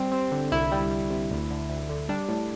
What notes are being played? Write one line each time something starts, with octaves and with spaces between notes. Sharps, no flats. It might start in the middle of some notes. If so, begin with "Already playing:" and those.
Already playing: G3 C4
C4
D3
C2 E4
G3
G3
C3
D2
D3
D2
D3
G3 D4
A2